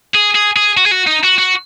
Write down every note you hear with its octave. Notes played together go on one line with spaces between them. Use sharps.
G#4
G#4
G#4
F#4
G#4
F#4
D#4
F#4
F#4